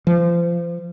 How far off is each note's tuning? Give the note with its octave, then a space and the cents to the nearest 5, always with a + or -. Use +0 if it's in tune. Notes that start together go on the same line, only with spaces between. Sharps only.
F3 -30